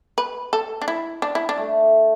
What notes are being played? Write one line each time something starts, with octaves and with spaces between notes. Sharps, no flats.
B4
A4
D4
E4
D4
E4
D4
A3